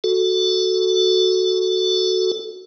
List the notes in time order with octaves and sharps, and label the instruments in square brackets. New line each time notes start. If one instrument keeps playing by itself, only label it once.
[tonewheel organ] F#4 A4